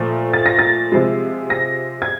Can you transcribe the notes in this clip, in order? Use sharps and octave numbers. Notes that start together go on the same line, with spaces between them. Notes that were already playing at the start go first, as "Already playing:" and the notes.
Already playing: A#2 F3 A3
A6
A#6
A6
C3 F3 G#3
A#6
G#6